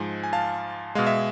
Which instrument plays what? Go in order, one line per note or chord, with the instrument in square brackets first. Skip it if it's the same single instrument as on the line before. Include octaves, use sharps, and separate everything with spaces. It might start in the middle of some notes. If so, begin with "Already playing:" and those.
Already playing: [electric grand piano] G#2 F3 G#3 G#5
G#5
F5 A5
B2 G#3 F5
E5